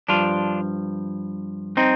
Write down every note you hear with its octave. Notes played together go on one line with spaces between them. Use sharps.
G2 F3 D4 F4
C4 D#4